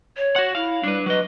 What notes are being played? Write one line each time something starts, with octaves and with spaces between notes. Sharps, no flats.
C#5
F#4 F#5
E4 F5
G3 D4 B4
F#3 B4 D#5